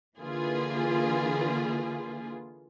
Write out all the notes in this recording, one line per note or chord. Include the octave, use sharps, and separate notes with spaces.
D3 E3 A#3 F4 G#4 B4